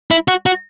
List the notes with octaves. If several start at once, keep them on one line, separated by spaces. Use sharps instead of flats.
E4
F#4
F#4